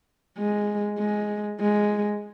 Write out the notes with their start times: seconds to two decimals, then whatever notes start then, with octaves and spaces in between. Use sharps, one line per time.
0.38 G#3
0.99 G#3
1.60 G#3